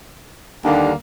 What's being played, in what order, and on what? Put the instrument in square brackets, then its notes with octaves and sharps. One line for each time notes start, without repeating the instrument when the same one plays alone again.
[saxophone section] D#2 D3 G3 A#3 D4